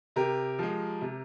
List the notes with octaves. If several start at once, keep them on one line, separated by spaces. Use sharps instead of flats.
C3 G4 A#4
F3 G#3
C3